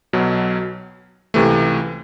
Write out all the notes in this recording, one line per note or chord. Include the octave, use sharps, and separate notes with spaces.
B1 B2 F#3
C#2 C3 E3 A3